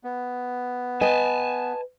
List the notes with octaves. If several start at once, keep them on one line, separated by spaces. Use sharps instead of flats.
B3
B4 D#5 G#5 A5